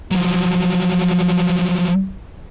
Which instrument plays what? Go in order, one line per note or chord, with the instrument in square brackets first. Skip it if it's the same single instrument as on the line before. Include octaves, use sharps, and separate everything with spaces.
[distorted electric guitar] F3 F#3